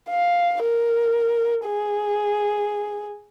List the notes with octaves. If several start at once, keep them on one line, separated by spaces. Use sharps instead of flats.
F5
A#4
G#4